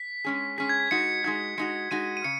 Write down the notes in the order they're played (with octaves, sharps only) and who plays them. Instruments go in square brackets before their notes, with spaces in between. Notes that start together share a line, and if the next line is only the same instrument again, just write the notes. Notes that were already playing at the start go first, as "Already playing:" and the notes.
Already playing: [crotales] B6
[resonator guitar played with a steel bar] G#3 C#4 G#4
[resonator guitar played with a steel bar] G#3 C#4 G#4 [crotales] B6
[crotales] G#6
B6
[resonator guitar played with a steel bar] G#3 D#4 F#4 [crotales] C#7
[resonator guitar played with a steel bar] G#3 D#4 F#4 [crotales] G#6
[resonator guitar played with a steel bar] G#3 D#4 F#4 [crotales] C#7
[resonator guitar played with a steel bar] G#3 D#4 F#4 [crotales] D#7
[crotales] D#7
[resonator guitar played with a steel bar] C#3 [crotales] C#7